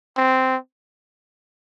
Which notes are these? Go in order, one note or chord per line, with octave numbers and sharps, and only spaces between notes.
C4